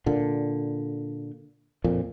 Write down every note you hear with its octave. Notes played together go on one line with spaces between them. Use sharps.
A#2 D3
F2 A#2